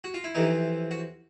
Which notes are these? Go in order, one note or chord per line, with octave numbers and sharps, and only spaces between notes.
F#4
F4
E4
F2 C3 E3 D#4
F#4